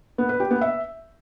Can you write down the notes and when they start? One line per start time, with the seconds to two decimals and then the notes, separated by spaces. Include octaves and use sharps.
0.18 B3
0.29 B4
0.40 G4
0.51 B3
0.61 E5